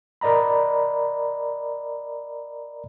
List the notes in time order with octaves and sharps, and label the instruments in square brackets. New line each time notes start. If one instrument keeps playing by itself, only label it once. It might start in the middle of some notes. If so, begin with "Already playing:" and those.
[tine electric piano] A#4 D5 D#5 A#5 B5